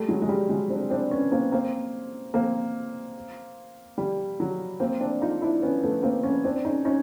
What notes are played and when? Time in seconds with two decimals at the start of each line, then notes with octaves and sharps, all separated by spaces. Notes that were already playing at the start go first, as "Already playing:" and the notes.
Already playing: G3 A3
0.08 F#3 G#3
0.22 G#3
0.29 G3
0.49 F#3 G#3
0.70 C4 D4
0.90 C4 D4
1.11 B3 C#4
1.32 A#3 C4
1.52 A#3 C4
2.34 A#3 C4
3.98 G3
4.40 F#3
4.80 A#3 C4
5.00 C4 D4
5.21 D#4 F4
5.41 D4 E4
5.62 B3 C#4
5.83 A3 B3
6.03 A#3 C4
6.23 B3 C#4
6.44 C4 D4
6.65 C#4 D#4
6.85 C#4 D#4